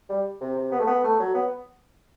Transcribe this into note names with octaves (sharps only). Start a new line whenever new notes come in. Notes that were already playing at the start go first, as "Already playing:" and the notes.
G3
C3
C3
B3
A3
B3
A3
F#3
B3